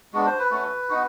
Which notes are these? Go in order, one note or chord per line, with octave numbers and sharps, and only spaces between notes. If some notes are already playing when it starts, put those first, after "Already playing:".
G#3 B3 D4 F#4
C5
B4
A3 C#4 F#4
B3 D#4 F#4